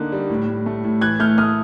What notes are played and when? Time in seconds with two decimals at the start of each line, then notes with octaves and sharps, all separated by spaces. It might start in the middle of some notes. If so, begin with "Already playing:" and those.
Already playing: D3 A#3 D#4 F#6
0.12 G3
0.30 A2
0.48 A2
0.66 A3
0.84 A2
1.01 E3 F#6 G#6
1.20 A3 F6 G6
1.38 A3 D#6 F6